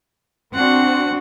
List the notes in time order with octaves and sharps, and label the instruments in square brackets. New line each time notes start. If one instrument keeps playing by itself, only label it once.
[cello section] C4 D4 F#4 [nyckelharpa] F#5